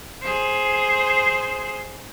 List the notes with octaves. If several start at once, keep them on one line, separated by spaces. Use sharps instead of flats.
G#4 C5